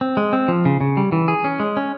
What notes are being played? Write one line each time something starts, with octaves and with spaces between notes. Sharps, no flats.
C4
G#3
C4
F3
C#3
C#3
G3
E3
G#4
C#4
G#3
C#4